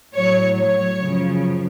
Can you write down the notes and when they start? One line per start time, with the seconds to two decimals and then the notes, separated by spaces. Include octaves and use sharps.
0.14 A2 F#3 C#5
0.57 C#5
0.99 F#2 C#3 F3